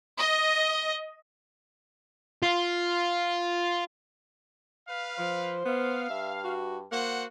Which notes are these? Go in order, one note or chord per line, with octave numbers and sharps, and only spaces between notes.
D#5
F4
B4 F5
F3 C5
B3 F5
G2 E5
F#4
A#3 F#4 C5 F#5